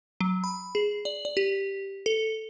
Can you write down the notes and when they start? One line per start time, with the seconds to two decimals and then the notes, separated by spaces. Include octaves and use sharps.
0.21 F#3
0.44 B5
0.75 G#4
1.05 D5
1.25 D5
1.37 G4
2.06 A4